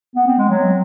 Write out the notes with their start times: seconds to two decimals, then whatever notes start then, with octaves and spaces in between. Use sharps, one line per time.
0.15 B3
0.27 C4
0.38 G#3
0.49 F#3